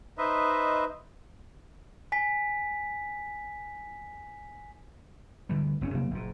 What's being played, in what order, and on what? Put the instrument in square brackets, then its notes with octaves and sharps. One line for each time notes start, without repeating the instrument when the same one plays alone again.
[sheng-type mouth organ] D#4 B4 C5 D#5 E5
[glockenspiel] G#5 B6
[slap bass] D2 D3 E3 G3
F#1 C4 C#4
C3 F#3 A#3 C4
F#1 A#2